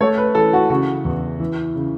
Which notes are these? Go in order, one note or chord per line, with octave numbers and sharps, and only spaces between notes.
A3 C#5
B4
E3 A4
F#4
C#3 F#4
E2
E3
C#3